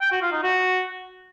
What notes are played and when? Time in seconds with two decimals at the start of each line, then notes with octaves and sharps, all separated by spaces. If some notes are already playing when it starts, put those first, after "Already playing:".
0.01 G5
0.12 F#4
0.22 F4
0.33 D#4
0.43 F#4